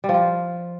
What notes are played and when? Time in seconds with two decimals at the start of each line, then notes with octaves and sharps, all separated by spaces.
0.04 G3
0.09 F3
0.14 F4